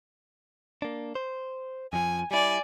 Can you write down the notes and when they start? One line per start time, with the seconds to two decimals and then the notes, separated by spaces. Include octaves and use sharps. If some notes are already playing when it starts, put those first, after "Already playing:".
0.82 A#3 D4
1.15 C5
1.93 F2 F3 G#5
2.31 G3 E4 D5 G#5